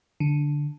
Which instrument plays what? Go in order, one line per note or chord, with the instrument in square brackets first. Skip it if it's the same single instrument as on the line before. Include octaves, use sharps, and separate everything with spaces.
[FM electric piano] D3